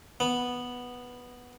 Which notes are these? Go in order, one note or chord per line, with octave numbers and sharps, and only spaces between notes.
B3